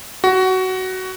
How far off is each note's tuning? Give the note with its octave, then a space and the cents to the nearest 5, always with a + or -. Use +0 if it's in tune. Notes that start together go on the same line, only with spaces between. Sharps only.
F#4 +15